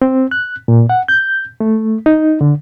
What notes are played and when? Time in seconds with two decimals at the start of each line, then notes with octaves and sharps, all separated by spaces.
0.02 C4
0.31 F#6
0.68 A#2
0.90 F#5
1.08 G6
1.60 A3
2.06 D#4
2.41 D3